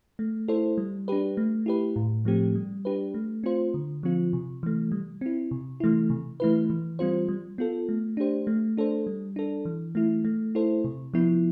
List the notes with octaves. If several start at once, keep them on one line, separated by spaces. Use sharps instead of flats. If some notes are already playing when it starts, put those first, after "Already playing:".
A3
E4 A4 C5
G3
D4 G4 B4
A3
E4 G4 B4
A2
F3 A3 C4 G4
G3
D4 G4 B4
A3
C4 F4 C5
D3
F3 C4 F4
C3
E3 A3
G3
C4 E4
C3
E3 A3 E4
C3
E3 A3 E4 B4
E3
G3 C4 F4 C5
G3
B3 F4 A4
A3
D4 G4 C5
A3
D4 A4 C5
G3
D4 A4
E3
A3 E4
A3
E4 A4 C5
C3
F3 B3 E4